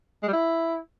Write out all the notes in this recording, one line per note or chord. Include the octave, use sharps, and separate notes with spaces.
G#3
G3
E4